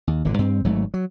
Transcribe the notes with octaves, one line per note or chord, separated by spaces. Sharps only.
D#2
G#1 A#2 D3
G2 C4
G#1 G#2 F#3 A3
F#3